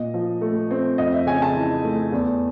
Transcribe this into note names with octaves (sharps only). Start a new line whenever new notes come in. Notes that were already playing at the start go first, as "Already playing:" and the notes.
Already playing: A#2 D#5
F3
A3
C4
F2 D#5
E5
C#3 G#5
A5
E3
A3
E2